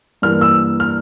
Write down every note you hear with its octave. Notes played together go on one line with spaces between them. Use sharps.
G2 E3 A#3 F6
E6
F6